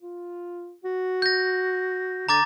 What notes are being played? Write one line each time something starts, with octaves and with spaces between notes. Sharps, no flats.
F4
F#4
G6 A#6
D3 A#5 D6 A6